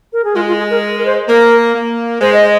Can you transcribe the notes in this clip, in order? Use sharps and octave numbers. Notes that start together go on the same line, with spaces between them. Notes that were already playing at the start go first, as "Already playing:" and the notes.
A#4
G#4
G#3 F4
F4
G#4
A#4
A#4
C5
A#3 A#4
A#3
G#3 C5
D#5